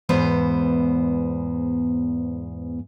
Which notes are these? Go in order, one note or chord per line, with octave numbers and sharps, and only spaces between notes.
E2 G#2 B3 C5